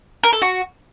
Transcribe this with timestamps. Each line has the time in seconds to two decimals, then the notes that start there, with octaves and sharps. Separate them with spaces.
0.23 A#4
0.33 A4
0.42 F#4